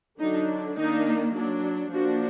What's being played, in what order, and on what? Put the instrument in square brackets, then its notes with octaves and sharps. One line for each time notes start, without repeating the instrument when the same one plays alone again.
[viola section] D3 F#3 D4 D#4
D#3 A#3 D4 D#4
F#3 D4
F3 A#3 D4 F#4